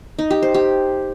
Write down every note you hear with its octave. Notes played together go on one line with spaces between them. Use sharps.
D#4
G4
C5
G4